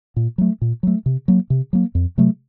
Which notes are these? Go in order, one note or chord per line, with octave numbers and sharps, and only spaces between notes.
A#2
F#3 A3
A#2
F#3 A3
C3
F#3 A#3
C3
F#3 A#3
F2
C3 F#3 A3